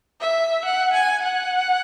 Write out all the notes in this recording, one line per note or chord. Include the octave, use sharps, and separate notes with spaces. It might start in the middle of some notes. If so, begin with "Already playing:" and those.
E5
F#5
G#5
F#5